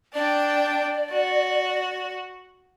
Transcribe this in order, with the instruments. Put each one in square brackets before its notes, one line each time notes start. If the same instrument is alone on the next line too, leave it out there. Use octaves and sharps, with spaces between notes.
[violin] D4 G5 [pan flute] D5
[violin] F#4